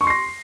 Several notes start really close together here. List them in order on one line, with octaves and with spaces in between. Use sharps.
C#6 C6 C7 A#6